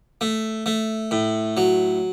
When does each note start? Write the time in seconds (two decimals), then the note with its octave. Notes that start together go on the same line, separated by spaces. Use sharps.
0.21 A3
0.66 A3
1.11 A2
1.57 F#3